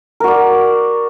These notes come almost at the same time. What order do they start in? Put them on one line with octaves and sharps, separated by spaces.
A#4 F#4 D5